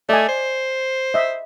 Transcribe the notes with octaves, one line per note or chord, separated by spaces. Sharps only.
A3 D5 D#5 G#5
C5
D#5 E5